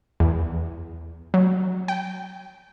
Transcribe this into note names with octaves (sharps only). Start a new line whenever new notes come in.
E2
F#3
G5